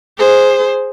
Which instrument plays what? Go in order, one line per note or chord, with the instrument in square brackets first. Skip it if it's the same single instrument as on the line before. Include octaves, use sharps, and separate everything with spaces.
[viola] G#4 C5